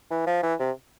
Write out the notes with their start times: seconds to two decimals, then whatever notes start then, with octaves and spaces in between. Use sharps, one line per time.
0.11 E3
0.27 F3
0.43 E3
0.60 C3